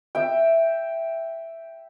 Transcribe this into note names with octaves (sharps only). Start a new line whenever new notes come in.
E5 G5